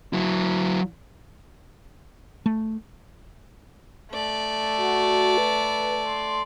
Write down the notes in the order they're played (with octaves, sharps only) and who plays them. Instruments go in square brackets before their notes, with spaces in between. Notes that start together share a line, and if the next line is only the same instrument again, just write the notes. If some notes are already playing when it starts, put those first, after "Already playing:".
[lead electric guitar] F#3 E4
[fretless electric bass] A3
[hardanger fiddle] A3 D5
[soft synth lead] F#4
B4
C6